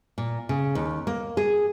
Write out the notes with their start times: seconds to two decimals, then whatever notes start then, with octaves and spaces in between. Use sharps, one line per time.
0.18 A#2
0.49 C#3
0.75 D#2
1.07 A#3
1.37 G#4